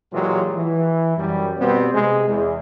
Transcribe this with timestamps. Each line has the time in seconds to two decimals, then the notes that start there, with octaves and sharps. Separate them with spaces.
0.14 A#2 E3 F#3 G#3 F4 G4
0.58 E3
1.17 F#2 G3
1.58 B2 G3 B3 C4
1.93 C3 G#3
2.29 E2